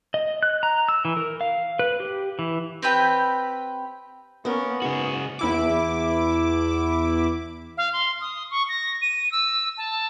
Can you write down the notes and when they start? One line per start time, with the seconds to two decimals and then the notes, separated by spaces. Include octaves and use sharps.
0.14 D#5
0.43 F#6
0.63 A#5
0.89 E6
1.05 E3
1.17 A#4
1.41 F5
1.79 B4
2.00 G4
2.39 E3
2.82 C4 G4 B4 G5
4.45 A#3 B3 C#4 A#4
4.82 G#2 C#3 F#4 G#4
5.39 E2 E4 D6
7.77 F5
7.93 C6
8.21 D#6
8.51 C#6
8.69 A#6
9.02 D#7
9.31 E6
9.77 A5